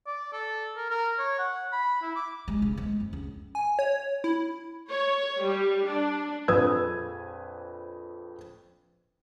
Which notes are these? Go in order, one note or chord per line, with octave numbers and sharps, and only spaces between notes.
D5
A4
A#4
A#4
C#5
F#5
B5
E4
D6
G#3
C#3
G#3
F2
C#2
G#5
C#5
E4
C#5
G3
D4
A#1 F2 B4 D#6 E6 G#6